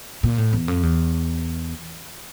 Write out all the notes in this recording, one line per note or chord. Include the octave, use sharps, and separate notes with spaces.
A#2
A2
E2
F2
E2